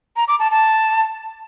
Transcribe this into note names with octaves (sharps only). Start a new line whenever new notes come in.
A#5
D6
A5
A5